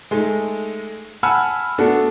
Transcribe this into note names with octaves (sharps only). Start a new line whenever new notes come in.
G#3 A3 D#4
F#5 G#5 A5 B5 E6 F6
A3 B3 D4 F#4 A4